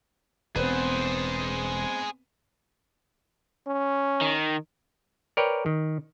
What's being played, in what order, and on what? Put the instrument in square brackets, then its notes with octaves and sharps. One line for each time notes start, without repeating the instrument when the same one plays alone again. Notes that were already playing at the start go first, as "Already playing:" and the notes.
[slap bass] E1 [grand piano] B3 C4 B4 [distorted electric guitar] G#4 C5
[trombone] C#4
[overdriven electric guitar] D#3
[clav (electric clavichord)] A#4 B4 C#5 D5 G5
D#3